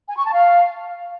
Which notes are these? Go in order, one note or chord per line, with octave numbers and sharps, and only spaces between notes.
G#5
C#6
A5
F5